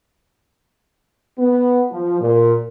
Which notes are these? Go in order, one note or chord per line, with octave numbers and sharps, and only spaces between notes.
B3
F3
A#2